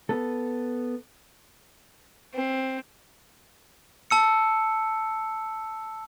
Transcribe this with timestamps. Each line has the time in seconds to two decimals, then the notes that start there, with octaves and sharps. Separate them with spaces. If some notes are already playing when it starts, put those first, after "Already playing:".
0.09 B3 A4
2.34 C4
4.11 A5 E6 C#7